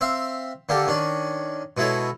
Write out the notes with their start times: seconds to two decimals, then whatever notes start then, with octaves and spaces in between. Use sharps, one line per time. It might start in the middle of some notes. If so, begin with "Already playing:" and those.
0.01 C4 E5 F5
0.69 D3 A#3 G4 A4
0.87 D#3 C#4 D4
1.77 B2 G#3 E4 A4 C#5